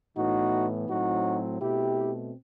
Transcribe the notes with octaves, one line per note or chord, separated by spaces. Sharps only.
A2 E3 B3 D#4 F#4
A2 F#3 C4 D#4 F#4
B2 A3 C4 E4 G4